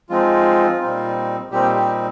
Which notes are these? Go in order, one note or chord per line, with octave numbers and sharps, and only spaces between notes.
F3 G#3 C4 D#4 F4
A#2 G3 C4 D#4
A#2 G3 C4 D#4 G4
G4